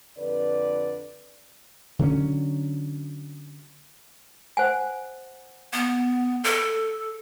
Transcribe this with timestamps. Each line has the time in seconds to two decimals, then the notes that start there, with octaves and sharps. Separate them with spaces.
0.17 F2 D3 B4 D5
1.99 D3 F#3 A#3 C#4
4.57 C5 F#5 G#5
5.73 B3
6.44 A4